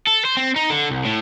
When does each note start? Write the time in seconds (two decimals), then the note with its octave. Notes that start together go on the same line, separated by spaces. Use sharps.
0.07 A4
0.25 C5
0.37 C4
0.56 D#4
0.70 D3
0.90 C2
1.05 A2